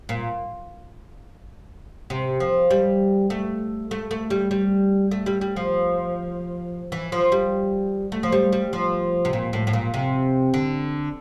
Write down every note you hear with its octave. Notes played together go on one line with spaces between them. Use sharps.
A#2
C3
F3
G3
A3
A3
A3
G3
G3
A3
G3
G3
F3
E3
F3
G3
A3
F3
G3
G3
F3
C3
A#2
A2
A2
A#2
C3
D3